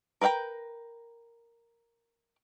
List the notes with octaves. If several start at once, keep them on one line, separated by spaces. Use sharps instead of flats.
A#4 B4 E5 G5 A#5